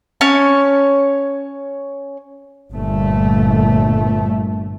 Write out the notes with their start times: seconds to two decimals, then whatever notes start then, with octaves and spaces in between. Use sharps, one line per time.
0.21 C#4 C#5 A5
2.71 G1 A#2 A3